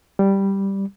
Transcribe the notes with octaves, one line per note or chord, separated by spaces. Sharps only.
G3